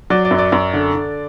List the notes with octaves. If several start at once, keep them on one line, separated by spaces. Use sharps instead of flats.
F#3 D5
D5
F#2
D5
F#2
D3
D3